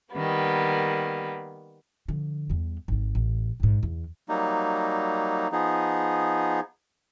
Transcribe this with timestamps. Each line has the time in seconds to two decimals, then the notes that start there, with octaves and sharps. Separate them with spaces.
0.14 D#3 G3 A#3 B3
2.08 D3 F3
2.50 E2 G3
2.88 G#1 G3
3.15 A1
3.60 A1 G#2
3.83 E2
4.29 F#3 G3 A#3 D#4
5.52 F3 B3 D#4 G#4